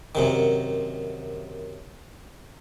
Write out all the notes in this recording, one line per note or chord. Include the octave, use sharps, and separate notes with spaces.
F#2 C3 D#3